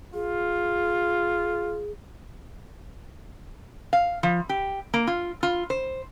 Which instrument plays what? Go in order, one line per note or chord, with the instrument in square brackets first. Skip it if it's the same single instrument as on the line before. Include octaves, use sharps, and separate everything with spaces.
[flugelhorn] F4 [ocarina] G#4
[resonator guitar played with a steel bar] F5
F3
G4
A#3
F4
F4
C5